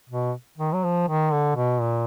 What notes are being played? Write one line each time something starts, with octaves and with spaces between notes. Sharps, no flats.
B2
D#3
F#3
F3
D#3
D3
B2
A#2